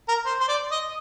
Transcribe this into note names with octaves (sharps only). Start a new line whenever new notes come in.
A#4
C5
C5
D5
D#5